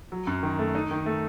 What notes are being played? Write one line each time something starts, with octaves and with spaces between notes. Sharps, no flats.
F#3
F#2
D#3
A3
D#4
D#3
A3